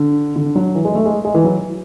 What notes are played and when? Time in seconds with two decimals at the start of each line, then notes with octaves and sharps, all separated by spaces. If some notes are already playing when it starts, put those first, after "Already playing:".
Already playing: D3
0.36 D3
0.56 F#3
0.75 E3
0.85 G#3
0.95 A3
1.05 G#3
1.25 G#3
1.34 E3
1.45 F#3